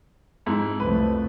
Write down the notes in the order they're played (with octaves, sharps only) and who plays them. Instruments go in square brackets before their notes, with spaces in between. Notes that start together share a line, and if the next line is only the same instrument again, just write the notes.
[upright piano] F2 G#2 E4
[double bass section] C2 F2 A3 [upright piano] B4